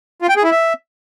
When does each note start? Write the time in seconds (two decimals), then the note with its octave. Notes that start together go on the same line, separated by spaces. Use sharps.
0.22 F4
0.29 G5
0.36 G#4
0.43 E4
0.51 E5